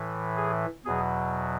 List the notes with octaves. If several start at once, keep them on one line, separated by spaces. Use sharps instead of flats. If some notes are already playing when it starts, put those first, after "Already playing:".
Already playing: A2 E3
G#4
E2 B2 F#3 G#4